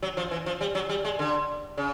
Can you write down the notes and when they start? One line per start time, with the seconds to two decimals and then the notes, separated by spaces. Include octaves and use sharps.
0.02 F#3
0.17 F3
0.31 E3
0.46 F3
0.61 G3
0.75 F#3
0.89 G3
1.04 G#3
1.19 D3
1.78 C#3